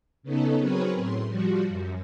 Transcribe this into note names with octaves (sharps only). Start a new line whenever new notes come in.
C#3 B3 C#4 D#4 A4
F#3 C4 G#4 A#4 B4 C#5
A2 C6
F3 G3 F#4
F#2